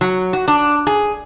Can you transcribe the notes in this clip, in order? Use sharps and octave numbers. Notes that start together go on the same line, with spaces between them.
F#3
F#4
D4
G#4